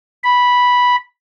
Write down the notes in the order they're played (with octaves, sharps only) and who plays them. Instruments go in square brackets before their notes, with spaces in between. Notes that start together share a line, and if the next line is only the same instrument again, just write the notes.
[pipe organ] B5